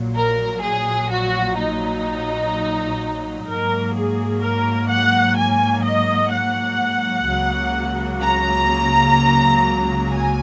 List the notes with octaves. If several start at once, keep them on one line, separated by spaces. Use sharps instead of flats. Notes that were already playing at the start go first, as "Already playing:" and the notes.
Already playing: A#1 A#2 F#3
A#4
G#4
F#4
D#4
G#2 F#3 A#3 A#4
G#4
A#4
F#5
G#5
D#5
F#5
C#2 C#3 F#3 A#3
A#5
G#5